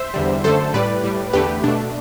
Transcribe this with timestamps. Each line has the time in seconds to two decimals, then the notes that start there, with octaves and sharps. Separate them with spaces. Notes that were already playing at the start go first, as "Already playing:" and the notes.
Already playing: C5 E5
0.14 E2 D3 G3
0.44 F#2 D3 A3 A4 C5
0.74 A2 G3 B4 D5
1.04 A2 G3
1.33 E2 D3 A3 G4 B4
1.64 B2 A3 D4